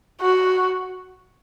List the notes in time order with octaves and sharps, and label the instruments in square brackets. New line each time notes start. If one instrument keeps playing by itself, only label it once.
[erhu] F#4